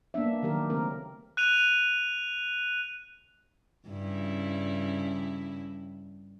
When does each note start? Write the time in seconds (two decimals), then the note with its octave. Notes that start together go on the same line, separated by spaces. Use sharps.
0.14 A#3 B3 D4 E5
0.43 D#3 F#3 G4 A#4
0.70 C#3 A3 C4 A#4
1.37 F#6 D#7 F7
3.88 G2 C#3 E4